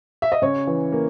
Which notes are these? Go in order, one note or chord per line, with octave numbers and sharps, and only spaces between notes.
E5
D#5
C#3 C#5
E3
A#3